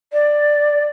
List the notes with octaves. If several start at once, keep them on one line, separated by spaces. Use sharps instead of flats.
D5